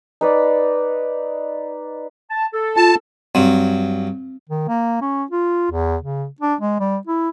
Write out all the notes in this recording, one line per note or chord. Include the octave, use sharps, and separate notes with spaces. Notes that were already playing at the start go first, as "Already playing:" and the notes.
D#4 B4 D5
A5
A4
F4 A5
G2 F#3 C4
D#3
A#3
C#4
F4
E2
C#3
D4
G#3
G3
E4